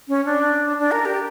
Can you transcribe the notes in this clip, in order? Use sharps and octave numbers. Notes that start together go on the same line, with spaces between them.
C#4
D4
D4
A#4
G4